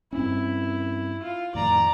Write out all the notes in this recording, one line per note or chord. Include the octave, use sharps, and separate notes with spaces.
G2 C4 C#4 E4
F4
F2 A2 D#3 D5 A#5